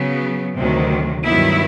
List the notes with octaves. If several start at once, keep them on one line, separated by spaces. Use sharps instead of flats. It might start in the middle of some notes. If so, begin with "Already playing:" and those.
Already playing: C#3 F#3 B3
D2 C3 D#3 F#3
G2 D#3 F#3 B3 E4